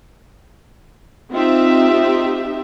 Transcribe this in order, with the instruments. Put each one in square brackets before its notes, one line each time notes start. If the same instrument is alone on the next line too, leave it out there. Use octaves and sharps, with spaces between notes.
[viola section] C4 D#4 F4 G4 E5